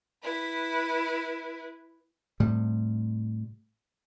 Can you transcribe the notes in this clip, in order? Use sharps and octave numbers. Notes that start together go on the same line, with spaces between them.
E4 B4
A2 C3 G3